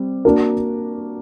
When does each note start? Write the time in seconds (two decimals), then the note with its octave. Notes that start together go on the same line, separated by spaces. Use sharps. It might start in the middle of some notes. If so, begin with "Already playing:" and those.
Already playing: G3 C4
0.25 A#3 D4 F#4 A#4